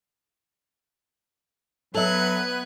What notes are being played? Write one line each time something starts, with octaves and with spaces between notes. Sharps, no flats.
F#3 B3 A4 B4 E5 F#6 G#6